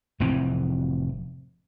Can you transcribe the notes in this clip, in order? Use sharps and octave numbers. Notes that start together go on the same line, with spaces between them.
F1 A2 E3 C4